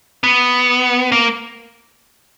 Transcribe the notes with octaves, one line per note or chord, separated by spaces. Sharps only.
B3
A#3